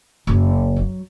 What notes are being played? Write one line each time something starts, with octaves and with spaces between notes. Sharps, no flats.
F#1
F#3